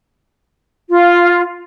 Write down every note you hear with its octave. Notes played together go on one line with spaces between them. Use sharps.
F4